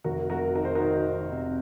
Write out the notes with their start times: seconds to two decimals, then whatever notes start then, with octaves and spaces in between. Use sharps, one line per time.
0.04 F1 F#4 A#4
0.30 F1 F#4 A#4
0.55 D#3 A#4
0.65 C5
0.75 D#3 F#4 A#4
1.06 D#3
1.31 C3